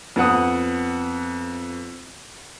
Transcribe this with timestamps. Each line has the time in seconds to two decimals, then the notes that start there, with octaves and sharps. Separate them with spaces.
0.16 F2 B3 F#5 D#6